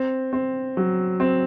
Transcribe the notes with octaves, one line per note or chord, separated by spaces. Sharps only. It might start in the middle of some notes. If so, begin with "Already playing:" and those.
Already playing: C4
C4
F#3
C4